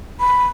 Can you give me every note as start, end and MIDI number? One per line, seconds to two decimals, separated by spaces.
0.20 0.45 83